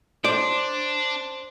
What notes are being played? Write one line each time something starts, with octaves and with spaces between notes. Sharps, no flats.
D4 C5 D5